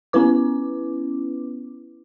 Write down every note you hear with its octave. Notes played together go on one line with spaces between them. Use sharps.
B3 C#4 E4 B4 D6